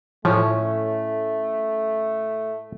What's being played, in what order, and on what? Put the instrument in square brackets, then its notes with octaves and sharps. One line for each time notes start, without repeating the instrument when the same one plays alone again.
[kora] A2 C#4 [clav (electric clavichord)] F3 [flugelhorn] A3